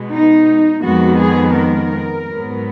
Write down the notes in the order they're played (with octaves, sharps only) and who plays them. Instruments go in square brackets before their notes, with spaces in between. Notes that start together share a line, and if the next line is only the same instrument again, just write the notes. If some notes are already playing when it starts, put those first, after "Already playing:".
Already playing: [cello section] B2 G#3 B3
D#4
F2 D#3 G#3 B3 F#4
G#4
A#4
G#2 F#3 B3